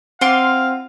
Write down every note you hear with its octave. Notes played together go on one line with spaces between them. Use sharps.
C4 F4 F5 F#5 C6 D6